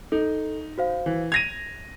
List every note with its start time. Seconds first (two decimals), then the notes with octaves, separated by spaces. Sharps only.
0.12 D#4 A4
0.78 F#4 C5 F5
1.06 E3
1.32 G#6 A#6 D#7 F7